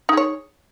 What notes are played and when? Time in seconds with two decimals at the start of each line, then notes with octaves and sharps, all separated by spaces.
0.09 D#4
0.13 G#4
0.17 C#5